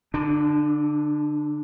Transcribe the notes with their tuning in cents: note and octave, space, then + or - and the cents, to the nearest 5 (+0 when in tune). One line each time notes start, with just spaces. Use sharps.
D3 -15 D4 +30